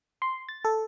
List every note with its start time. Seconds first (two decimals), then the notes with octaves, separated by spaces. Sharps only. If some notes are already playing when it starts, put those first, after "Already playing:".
0.22 C6
0.49 A6
0.65 A4